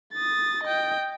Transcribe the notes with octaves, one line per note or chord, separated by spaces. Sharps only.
D#6 A6
D#5 G5